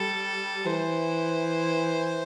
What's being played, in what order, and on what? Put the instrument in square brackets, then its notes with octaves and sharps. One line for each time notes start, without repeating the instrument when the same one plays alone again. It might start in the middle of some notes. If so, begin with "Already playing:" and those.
Already playing: [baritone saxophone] G3 [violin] A4
[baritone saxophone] E3 [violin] C5